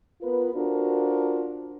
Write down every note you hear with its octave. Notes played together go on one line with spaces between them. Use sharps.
B3 F4 A#4 B4
D4 F4 F#4 A4 A#4 C5